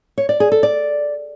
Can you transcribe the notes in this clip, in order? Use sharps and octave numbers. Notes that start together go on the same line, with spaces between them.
C#5
D5
G#4
A4
D5